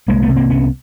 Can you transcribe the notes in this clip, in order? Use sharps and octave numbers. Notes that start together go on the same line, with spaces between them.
C2 G#3 A#3
A3 B3
C3
A#3 C4
C2 B3 C#4